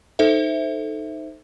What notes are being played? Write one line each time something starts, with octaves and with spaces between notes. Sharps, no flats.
D#4 A4 C5 E5